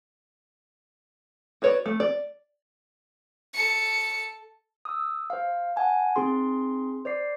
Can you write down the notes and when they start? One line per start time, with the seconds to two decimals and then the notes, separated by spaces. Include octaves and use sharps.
1.62 F#4 B4 C#5 D5
1.86 A3
2.00 D5
3.54 A4 C#7
4.85 D#6 E6
5.30 C5 F5
5.76 F#5 G#5 A5
6.16 C4 D#4 G#4 C6
7.05 C5 D5 D6 C7